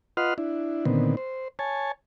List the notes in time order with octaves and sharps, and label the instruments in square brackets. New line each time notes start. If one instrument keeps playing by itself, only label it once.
[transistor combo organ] F4 B4 D#5 F#5 C6 F6
D4 E4
A#2 D3 D#3 B3 C4
C5
C#5 G#5 A5